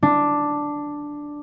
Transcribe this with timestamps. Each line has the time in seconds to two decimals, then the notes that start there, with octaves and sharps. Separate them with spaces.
0.03 D4